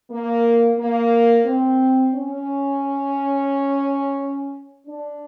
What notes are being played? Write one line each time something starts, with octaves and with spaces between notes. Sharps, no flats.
A#3
A#3
C4
C#4
D4